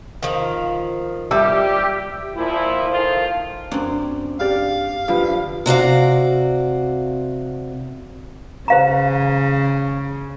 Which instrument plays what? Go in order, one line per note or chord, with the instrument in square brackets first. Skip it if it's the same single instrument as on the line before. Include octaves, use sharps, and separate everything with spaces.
[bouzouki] D#3 F3
[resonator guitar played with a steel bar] G3 [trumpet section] G4 [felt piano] E5 E6
[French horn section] A#2 F3 E4
D#3 F4 A4 C5
[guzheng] F#2 C4 [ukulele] D4
[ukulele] D4 G4 D5 [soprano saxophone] F5 [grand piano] F6
[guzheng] D3 [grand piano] F3 [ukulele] G4 B4
[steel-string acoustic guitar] C3 F#4 D5 F5
[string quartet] C#3 [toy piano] C5 F5 A#5